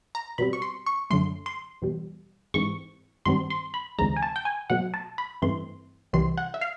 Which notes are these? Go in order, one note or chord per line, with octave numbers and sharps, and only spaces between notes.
A#5
B2 G3 C4 B5
C#6
C6
C#6
F#2 D3 F#3 A3 C6
C6
E2 B2 G3
G#2 E3 G#3 C4 C#6
G2 D#3 G3 C4 C6
C6
B5
D2 C3 E3 G#3 A#5
G#5
A5
G5
G#5
B2 F#3 A3 F#5
A5
B5
G2 E3 A3 C4 C6
C2 C3 E3 G3 C6
F#5
E5
F5